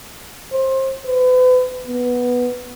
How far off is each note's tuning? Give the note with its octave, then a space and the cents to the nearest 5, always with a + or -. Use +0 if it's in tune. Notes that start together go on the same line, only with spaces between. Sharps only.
C5 +25
B4 +40
B3 -5